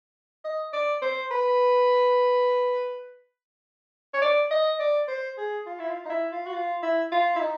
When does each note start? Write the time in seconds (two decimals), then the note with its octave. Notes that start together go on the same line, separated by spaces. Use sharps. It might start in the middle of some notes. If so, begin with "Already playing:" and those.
0.45 D#5
0.73 D5
1.02 C5
1.31 B4
4.14 C#5
4.22 D5
4.51 D#5
4.79 D5
5.08 C5
5.38 G#4
5.66 F4
5.79 E4
5.89 F4
6.05 D#4
6.10 E4
6.32 F4
6.46 F#4
6.54 F4
6.83 E4
7.12 F4
7.36 E4
7.41 D#4